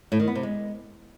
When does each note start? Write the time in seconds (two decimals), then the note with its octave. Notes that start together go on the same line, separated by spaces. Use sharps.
0.12 A2
0.20 D#3
0.27 B3
0.35 C3
0.43 G#3